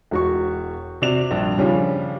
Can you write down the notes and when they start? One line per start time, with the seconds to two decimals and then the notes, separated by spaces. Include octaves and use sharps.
0.11 E1 F#4 C#6
1.02 C3 F#4 D5 F7
1.31 A#1 G2
1.58 D#2 C#3 F3 G3 C#4 D4